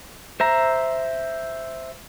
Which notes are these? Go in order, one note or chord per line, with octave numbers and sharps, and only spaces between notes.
C5 E5 A#5